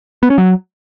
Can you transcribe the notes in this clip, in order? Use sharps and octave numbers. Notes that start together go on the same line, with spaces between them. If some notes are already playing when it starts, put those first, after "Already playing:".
B3
C#4
F#3